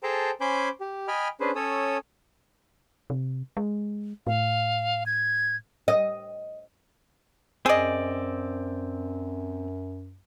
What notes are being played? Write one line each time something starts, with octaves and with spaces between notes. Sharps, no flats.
G#4 A4 C5 G5 A5 A#5
C#4 C5 G#5 B5 D6 G6
G4
D#5 G5 G#5 B5 F6
C#4 D4 G#4 B4 C5
C#4 A4 C#5 D#6 E6
C3
G#3
A2 F5
G#6
D#5
F#2 C4 G#4 D5 D#5